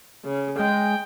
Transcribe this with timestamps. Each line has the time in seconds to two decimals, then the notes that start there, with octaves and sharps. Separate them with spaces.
0.25 C#3
0.59 G#3 G5